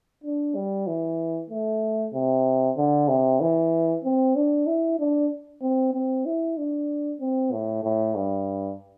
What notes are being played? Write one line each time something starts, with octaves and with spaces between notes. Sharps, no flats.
D4
G3
E3
A3
C3
D3
C3
E3
C4
D4
E4
D4
C4
C4
E4
D4
C4
A2
A2
G2